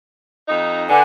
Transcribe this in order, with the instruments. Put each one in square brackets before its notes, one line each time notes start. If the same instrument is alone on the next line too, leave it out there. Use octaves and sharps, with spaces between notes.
[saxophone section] F2 D#4
[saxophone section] D3 [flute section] B4 F#5 G#5